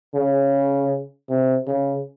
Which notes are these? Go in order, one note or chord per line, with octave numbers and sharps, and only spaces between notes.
C#3
C3
C#3